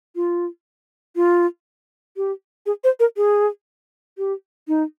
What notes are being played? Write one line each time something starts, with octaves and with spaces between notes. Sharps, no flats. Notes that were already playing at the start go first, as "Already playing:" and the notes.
F4
F4
G4
G#4
C5
A#4
G#4
G4
D#4